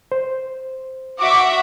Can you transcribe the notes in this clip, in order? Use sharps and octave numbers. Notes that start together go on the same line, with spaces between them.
C5
F#4 E5 F#5 D6